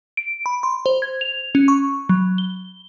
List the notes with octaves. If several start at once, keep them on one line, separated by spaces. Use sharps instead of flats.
D7
B5
C6
C5
G#6
F7
C#4
C#6
F#3
G7